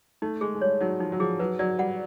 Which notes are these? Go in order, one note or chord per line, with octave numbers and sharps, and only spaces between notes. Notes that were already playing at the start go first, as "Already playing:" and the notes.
A3 D#4
G#3 G#4
G#3
G3 C#5
F#3 D#4
F3 D#4
F#3
F3 G#4
F#3 B4
F#3 D5
G3 F#5